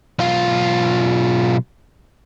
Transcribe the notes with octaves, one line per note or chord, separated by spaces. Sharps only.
B1 F4